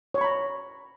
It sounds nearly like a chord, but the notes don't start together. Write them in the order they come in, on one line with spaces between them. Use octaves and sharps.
C#5 C#6 B5 A#5